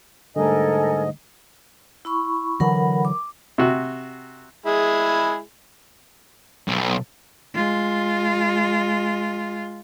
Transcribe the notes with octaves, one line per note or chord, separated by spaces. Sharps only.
G#2 D3 G3 A3 A4 A#4 D#5 G#5
E4 B5 C#6
D3 E3 F#3 A#4 F#5 B5
D6
C3 F#4
G#3 E4 G#4
B1
G#3 F4